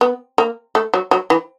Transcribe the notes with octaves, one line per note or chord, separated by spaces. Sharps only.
B3
A#3
A3
F#3
F#3
E3